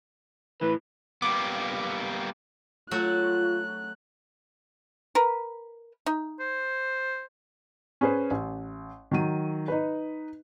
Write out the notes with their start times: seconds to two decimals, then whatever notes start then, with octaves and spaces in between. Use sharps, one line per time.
0.61 A2 E3 B4
1.22 G3 A#3 B3 D6
2.91 F#3 A3 F4 F#4 F#6
5.15 A#4 B4
6.06 D#4
6.40 C5
8.01 C#4 G#4 B4 C5
8.31 A1
9.11 D#3 F#3 D#7
9.68 D#4 B4